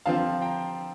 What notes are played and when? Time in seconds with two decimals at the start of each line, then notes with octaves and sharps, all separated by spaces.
0.06 D3 F3 C4 F5 A5
0.42 G5 A#5